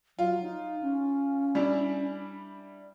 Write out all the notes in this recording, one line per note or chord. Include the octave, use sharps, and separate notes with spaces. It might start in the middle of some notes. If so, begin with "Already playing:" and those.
F#3 F4
D#4
C#4
G3 D4 E4